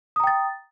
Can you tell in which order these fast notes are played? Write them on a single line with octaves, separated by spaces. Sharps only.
D#6 A#5 G5 A6